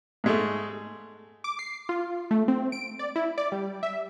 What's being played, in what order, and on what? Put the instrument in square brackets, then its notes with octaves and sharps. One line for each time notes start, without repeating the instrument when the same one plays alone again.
[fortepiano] G#2 G#3 A3
[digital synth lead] D6
C7
F4
A3
C4
D7
D5
E4
D5
G3
E5